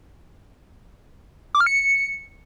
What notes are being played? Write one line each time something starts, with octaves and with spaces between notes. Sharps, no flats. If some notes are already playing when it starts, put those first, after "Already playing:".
D6
F6
C#7